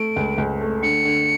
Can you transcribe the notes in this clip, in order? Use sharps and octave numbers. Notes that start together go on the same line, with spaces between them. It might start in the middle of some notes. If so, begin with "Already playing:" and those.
Already playing: A3 D7
C#2
C#2
A3
D3 C#7
D3